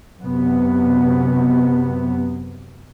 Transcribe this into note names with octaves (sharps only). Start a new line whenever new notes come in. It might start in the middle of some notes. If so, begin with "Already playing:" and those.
F#2 C3 B3